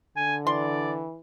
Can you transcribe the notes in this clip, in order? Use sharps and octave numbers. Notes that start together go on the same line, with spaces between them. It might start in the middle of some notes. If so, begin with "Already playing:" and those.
D3 G#5
E3 D5 C6